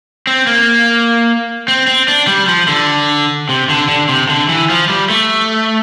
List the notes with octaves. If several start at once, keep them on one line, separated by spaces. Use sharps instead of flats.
C4
A#3
C4
C4
D4
G3
F3
D3
C3
D3
D3
C3
D3
E3
F3
G3
A3